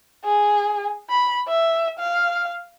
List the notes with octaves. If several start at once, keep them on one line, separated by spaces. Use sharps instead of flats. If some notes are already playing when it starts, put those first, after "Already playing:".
G#4
B5
E5
F5